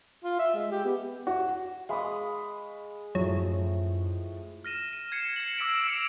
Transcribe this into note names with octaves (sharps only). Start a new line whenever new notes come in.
F4
E5
G#3
G4
B3
F#4
G#3 F5 B5 C#6 D#6
F#2 A2 F3 F#3
F6 A#6 D#7 E7
D#7
G#6 C7 C#7 E7
G#6 C7 C#7 E7 F#7
D6 E6 A#6 B6 D7 F#7
E6 C#7 D7 F7